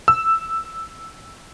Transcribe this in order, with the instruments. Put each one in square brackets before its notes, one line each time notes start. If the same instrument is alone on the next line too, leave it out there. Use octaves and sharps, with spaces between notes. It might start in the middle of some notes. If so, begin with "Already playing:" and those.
[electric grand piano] E6